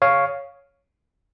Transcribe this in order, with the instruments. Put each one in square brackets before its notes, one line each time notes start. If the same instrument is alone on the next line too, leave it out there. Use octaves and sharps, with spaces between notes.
[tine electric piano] C#5 F5